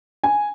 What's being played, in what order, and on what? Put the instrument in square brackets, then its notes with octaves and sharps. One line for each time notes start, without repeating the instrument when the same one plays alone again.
[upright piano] G#5